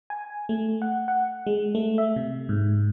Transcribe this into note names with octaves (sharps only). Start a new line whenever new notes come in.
G#5
A3
F#5
F#5
G#3
A3
E5
C3
G#2